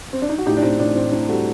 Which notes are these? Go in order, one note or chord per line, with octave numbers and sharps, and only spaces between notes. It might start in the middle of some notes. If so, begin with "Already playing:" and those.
C4
D4
D#4
F#4
A2 D#4 G4
D4
A2 C4 D#4
A2 D4
A2 C4
A2 D4
G3 F#4 A4